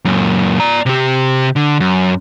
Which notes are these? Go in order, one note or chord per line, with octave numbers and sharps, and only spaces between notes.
F#2 A#2
D5 A#5
C3 G4
D3
F#2